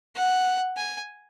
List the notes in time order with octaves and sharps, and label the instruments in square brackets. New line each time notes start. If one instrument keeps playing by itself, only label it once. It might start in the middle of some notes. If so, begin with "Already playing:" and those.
[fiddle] F#5
G#5